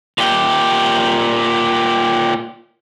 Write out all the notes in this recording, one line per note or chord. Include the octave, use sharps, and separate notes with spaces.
A#2 G4